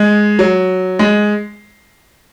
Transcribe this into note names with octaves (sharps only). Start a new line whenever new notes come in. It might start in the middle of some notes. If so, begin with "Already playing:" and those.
Already playing: G#3
F#3
G#3